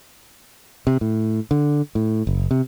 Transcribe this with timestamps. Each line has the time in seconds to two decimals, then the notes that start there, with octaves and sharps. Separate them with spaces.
0.87 C3
1.01 A2
1.51 D3
1.95 A2
2.27 F#1
2.51 C3